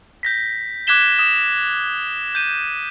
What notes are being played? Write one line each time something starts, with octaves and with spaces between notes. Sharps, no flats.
G6 A#6 B6
D6 F#6 G#6 B6 E7 G7
D#6 E7
G6 D#7